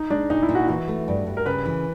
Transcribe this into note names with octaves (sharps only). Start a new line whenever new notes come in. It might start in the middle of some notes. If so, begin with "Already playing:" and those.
Already playing: D#4
G#3 D4
A#2 D#4
E4
A#2
F#4
E3 F#4
A3
G2
G2
A#4
C#3 B4
E3